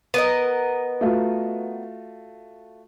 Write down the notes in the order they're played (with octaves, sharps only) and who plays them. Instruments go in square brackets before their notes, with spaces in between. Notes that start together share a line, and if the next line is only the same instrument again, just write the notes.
[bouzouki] B3 A#4 D#5
[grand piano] A3 F4 F#4